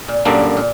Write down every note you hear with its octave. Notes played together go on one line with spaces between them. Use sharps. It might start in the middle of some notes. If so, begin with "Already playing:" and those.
A#2
F#2 A#2 D3 G3 A#3 D4
A#2